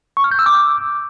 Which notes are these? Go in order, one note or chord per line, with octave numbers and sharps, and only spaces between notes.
C#6
F6
G6
E6
D6